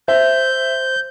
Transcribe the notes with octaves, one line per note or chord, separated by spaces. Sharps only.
C5 E5 G6